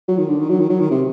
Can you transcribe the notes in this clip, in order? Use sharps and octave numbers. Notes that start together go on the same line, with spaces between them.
F#3
D#3
D3
D#3
F#3
D#3
F#3
D#3
C3